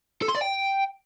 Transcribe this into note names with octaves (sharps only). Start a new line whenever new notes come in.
A4
C6
D5
G5